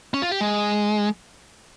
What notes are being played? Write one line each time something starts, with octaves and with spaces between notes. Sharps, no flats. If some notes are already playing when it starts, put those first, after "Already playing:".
C#4
F4
G4
G#3